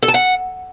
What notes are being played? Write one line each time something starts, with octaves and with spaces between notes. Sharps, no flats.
A4
A5
F#5